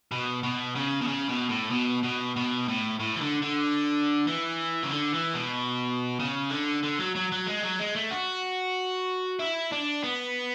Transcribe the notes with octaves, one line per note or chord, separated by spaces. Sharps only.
B2
B2
C#3
B2
C#3
B2
A2
B2
B2
B2
A2
A2
E3
D3
D3
E3
C#3
D3
E3
B2
C#3
D3
D3
F#3
F#3
F#3
G#3
F#3
G#3
A3
F#4
E4
D4
B3